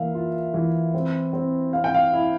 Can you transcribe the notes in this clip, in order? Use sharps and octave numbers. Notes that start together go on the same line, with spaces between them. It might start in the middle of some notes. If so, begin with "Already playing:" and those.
Already playing: E3 A#3 E5 F5
F4
E3
C4
C4
C4 F5
G5
F5
E4